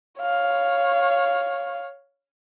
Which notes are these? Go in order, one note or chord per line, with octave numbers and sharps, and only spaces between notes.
C#5 F5